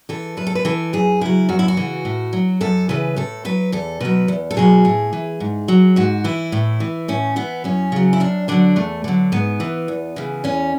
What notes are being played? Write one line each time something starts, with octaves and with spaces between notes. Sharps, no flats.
E3 A4
F#2 B4
A4
B4
E3 A4
F#2 G#4
C#3 F#3 E4
F#2 F#4
E4
F#4
C#3 E3
A2
F#3
F#2 A4
C#3 E3 B4
A2 A4
F#3 B4
E2 A4
B2 F#3 B4
E2
A4
B2 F#3 G#4
A2
E3
G#2
F#3
G#2 F#4
E3 E4
A2
E3
A2 C#4
E3 B3
F#2 C#4
C#3 F#3
E4
F#2 D4
D3 F#3 D4
E2 A3
D3 F#3
G#2 B3
E3
E2
C#3 E3
E2 C#4